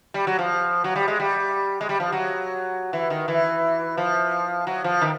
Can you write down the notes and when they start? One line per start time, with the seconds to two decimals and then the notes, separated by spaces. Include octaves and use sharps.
0.14 G3
0.27 F#3
0.39 F3
0.84 F#3
0.96 G3
1.08 G#3
1.20 G3
1.81 G#3
1.89 G3
2.00 F3
2.12 F#3
2.93 E3
3.10 D#3
3.28 E3
3.97 F3
4.67 F#3
4.84 F3
5.01 D#3